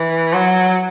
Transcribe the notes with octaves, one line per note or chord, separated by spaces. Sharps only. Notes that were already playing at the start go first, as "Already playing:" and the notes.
Already playing: E3
F#3